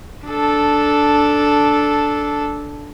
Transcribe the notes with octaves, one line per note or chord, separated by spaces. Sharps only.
D4 A4